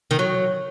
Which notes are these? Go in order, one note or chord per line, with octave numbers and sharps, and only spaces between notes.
D#3
F#3